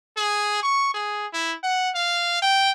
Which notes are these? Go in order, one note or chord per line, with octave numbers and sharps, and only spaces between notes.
G#4
C#6
G#4
E4
F#5
F5
G5